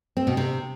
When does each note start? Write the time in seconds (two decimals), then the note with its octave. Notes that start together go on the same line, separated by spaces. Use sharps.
0.17 C4
0.27 B2
0.37 C3